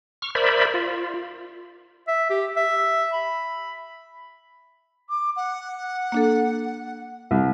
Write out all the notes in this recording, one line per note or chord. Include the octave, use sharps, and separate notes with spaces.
C#6 F6
A#4 C5 D5 E5 B5
F4
E5
G4
E5
B5
D6
F#5
A#3 D4 A4
C2